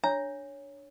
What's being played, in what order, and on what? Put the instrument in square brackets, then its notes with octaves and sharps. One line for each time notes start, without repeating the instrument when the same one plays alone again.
[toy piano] D4 C#5 [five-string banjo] A#5